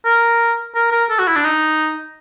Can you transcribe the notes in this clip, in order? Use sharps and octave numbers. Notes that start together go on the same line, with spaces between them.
A#4
A#4
A#4
A4
F#4
E4
D4
D#4